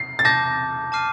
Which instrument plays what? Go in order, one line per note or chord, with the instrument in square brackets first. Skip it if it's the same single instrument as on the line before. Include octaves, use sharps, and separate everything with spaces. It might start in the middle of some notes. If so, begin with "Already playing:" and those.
Already playing: [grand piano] C7
A6
[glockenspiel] A5 D6 G6 [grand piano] A#6
[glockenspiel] A5 D6 F6 C7 D#7